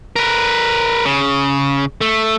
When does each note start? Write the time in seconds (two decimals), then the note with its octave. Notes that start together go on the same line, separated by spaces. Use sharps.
0.16 A#4 B4
1.05 C#3
2.01 A3